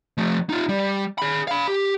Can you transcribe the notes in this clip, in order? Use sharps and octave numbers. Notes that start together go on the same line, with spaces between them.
F3 A3
D#4 F4
G3
G#4 B5
F5 B5
G4